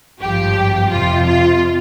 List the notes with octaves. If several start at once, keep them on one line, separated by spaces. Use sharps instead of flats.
G#1 G2 F3 G4
F2 C3 F3 F4
F4